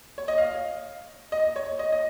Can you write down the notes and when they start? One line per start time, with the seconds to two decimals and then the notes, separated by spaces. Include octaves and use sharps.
0.18 C#5
0.28 D#5
0.38 F5
1.32 D#5
1.56 C#5
1.79 D#5
1.92 D#5